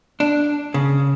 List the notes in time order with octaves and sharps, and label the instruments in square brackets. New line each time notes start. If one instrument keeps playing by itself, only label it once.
[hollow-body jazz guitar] D4
C#3